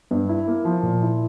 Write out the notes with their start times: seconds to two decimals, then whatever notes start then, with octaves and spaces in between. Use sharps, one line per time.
0.11 G2
0.29 E4
0.47 A#3
0.65 F3
0.83 A#2
1.02 E4